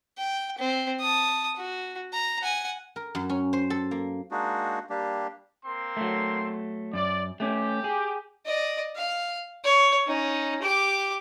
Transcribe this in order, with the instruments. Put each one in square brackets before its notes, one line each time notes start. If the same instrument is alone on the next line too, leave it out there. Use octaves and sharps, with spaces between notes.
[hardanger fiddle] G5
C4
A5 D#6
F#4
A#5
F#5 G#5
[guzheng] A#4
F#2
C#4
C5
A4
A#3
[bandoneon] G#3 A#3 D4 D#4 F#4
G3 A#3 D4 G4
[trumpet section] A#3 C4 C6
[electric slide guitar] F#3 A3
[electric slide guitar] F#2 [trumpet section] D5
[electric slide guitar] A3 C#4 [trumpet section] G4
[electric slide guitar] G#4
[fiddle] D5 D#5
F5
C#5
C#4 D#4
G4 D6